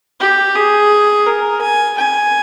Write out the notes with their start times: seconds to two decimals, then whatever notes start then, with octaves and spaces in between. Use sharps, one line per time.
0.20 G4
0.56 G#4
1.27 A#4
1.62 G#5
1.97 G#5